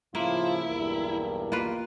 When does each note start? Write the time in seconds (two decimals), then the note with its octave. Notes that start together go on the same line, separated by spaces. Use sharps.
0.15 A2 C#3 F3 A#3 E4 F4
0.66 B1 E2 G2 A#4
1.52 A#3 F4 B4